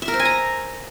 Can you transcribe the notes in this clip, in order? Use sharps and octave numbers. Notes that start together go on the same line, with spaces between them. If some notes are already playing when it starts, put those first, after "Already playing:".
E5
A#4
C5
G#5
A#5